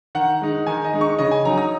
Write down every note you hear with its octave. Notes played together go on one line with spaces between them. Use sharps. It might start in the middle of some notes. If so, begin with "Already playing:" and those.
D#3 F#5
G#3 D#4
D#3 G#5
D#5
G#3 D#4
C#6
C#3 D#5
G#5
F#3 D#4 A#5
D#6